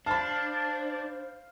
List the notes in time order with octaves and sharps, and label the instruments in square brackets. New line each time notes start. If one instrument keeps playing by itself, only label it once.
[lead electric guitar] D4 [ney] C5 [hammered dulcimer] F5 [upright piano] A5 B5